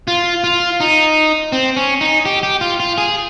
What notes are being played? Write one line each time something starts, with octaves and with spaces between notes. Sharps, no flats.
F4
F4
D#4
C4
C#4
D#4
G4
G4
F4
F4
G#4